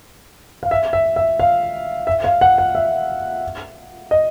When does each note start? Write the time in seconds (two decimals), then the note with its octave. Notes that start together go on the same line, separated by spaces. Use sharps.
0.63 F5
0.71 E5
0.93 E5
1.16 E5
1.40 F5
2.07 E5
2.24 F5
2.41 F#5
2.58 F#5
2.75 E5
4.11 D#5